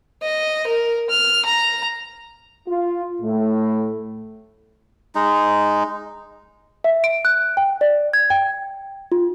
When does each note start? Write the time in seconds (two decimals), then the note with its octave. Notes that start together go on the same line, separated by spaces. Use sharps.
0.22 D#5
0.67 A#4
1.10 F6
1.45 A#5
2.68 F4
3.22 A2 A3
5.15 G#3 D#4
6.84 E5
7.04 D7
7.25 F#6
7.57 G5
7.81 D5
8.13 G#6
8.30 G5
9.12 F4